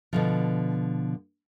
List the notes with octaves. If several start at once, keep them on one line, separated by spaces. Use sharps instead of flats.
B2 D3 F3